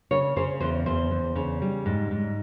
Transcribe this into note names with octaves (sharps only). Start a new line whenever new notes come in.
C#3 C#5
C#3 C5
E2 C5
E2 C5
E2
C#3
G3
G#2
G#2